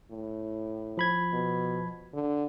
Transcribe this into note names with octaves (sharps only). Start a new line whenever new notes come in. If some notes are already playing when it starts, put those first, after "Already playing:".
A2
F3 B5 G#6
B2
D3